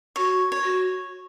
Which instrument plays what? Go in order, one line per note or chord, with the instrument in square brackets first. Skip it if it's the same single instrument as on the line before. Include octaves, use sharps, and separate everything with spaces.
[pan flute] F#4 [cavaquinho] C#5
[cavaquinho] C#5
[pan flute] F#4